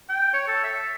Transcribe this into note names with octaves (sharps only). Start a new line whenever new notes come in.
G5
C#5
A4
E5